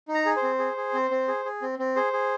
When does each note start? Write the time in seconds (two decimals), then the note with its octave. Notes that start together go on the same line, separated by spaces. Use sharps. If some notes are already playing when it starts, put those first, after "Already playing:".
0.08 D#4
0.14 A#5
0.26 G#4
0.36 C5
0.43 C4
0.59 G#4
0.77 G#4
0.93 C4
1.11 C4
1.28 G#4
1.45 G#4
1.62 C4
1.79 C4
1.96 G#4 C5
2.13 G#4